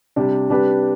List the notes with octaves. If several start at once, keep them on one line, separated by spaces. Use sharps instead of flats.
C3 G3 D4 G4
C3 G3 D4 G4 B4